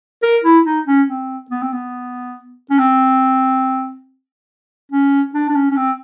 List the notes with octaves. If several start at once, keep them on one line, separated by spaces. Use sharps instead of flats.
A#4
E4
D#4
C#4
C4
B3
C4
B3
C#4
C4
C#4
D4
D4
C#4
C#4
C4